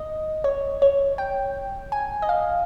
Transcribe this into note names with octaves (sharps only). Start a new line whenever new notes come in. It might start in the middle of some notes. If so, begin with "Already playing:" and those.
Already playing: D#5
C#5
C#5
G5
G#5
D#5
F5